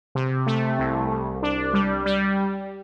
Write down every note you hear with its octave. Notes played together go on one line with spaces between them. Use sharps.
C3
A3
C2
C2
D4
G3
G3